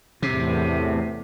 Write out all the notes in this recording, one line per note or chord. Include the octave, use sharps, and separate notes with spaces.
E2 A2 C3